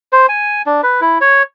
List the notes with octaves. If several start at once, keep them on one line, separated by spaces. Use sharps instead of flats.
C5
G#5
D4
B4
E4
C#5